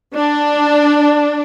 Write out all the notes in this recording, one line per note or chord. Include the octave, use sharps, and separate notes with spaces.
D4